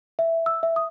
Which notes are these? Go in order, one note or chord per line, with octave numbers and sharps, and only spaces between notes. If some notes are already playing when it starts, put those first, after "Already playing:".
E5
E6
E5
D#6